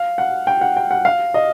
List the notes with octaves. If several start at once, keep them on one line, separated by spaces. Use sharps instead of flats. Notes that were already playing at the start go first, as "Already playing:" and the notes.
Already playing: F5
F#5
G5
F#5
G5
F#5
F5
D#5